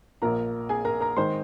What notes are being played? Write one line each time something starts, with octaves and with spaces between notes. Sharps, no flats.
A#1 A#2 F3 A#4 A#5
G#4 G#5
A#4 A#5
A#4 A#5
D#3 G#3 C5 C6